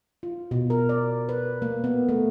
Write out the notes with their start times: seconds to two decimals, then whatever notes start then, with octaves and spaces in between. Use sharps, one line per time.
0.23 F4
0.51 B2
0.70 A#4
0.89 D5
1.29 B4
1.62 A#3
1.84 B3
2.09 A3